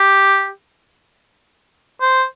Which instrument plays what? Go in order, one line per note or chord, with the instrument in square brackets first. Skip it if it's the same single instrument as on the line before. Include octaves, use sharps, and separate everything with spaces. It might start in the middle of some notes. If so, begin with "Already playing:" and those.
Already playing: [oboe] G4
C5